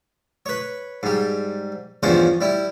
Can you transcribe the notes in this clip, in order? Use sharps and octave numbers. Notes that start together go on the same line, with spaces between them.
B4 C#5
G#2 G3
E2 G2 F3 C#4 C5
G3 E4